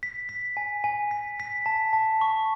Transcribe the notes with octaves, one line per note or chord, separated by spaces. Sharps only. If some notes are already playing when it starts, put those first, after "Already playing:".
B6
B6
G#5
G#5
B6
B6
A5
A5
C#6